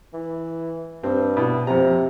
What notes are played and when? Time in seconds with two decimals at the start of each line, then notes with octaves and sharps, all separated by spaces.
0.14 E3
1.03 G2 C4
1.36 B2 E4
1.67 F2 C3 C4 A#5